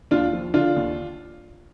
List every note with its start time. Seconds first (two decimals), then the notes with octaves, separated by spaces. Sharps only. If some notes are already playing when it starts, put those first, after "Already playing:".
0.11 D#2 D4 F4
0.33 F3
0.54 D3 D4 F4
0.76 D#2